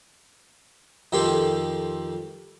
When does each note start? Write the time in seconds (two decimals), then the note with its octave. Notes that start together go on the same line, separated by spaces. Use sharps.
1.12 F2 D#3 F3 G4 A4 C6